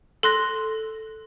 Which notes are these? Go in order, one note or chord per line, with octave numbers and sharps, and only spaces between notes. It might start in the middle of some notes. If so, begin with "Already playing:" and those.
A4 C6 F#6 A#6